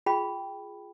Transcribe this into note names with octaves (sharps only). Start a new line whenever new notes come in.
F4 G#4 G5 B5